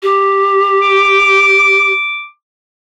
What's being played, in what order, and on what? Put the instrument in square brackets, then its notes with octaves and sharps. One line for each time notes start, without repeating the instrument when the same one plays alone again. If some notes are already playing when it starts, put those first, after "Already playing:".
[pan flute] G4
[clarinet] D6